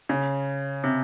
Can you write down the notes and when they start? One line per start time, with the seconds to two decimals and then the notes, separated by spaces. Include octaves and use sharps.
0.09 C#3
0.84 C3